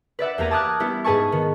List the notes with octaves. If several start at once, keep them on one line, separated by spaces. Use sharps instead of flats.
B4 D5 E5 F#5
E2 A#3 G4 A#5 G#6 D#7
A5 D6 D#6 F6 F#6 G#6
G3 B3 E4 G4
G#2 G#4 B4 G#5 A5 C#6
D#3 B3